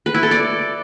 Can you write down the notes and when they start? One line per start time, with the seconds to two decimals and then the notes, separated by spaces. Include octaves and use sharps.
0.06 B4
0.14 E4
0.23 A4
0.31 D5